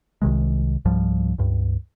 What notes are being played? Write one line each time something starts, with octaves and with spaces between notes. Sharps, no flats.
C2 C3 D#3 G#3
C#2 G#2 F3 G3
C#2 G2